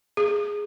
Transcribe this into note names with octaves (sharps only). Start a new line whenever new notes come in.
G#4